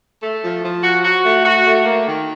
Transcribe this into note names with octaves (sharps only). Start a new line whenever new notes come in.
A3
F3
F3
F#4
F#4
A3
F#4
A3
A#3
D#3